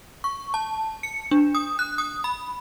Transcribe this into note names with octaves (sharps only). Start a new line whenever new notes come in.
C#6
A5
C#7
D4
D#6
F#6
D#6
B5